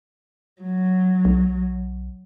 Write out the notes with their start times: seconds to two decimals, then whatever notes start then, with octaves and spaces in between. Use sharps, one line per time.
0.62 F#3
1.25 B1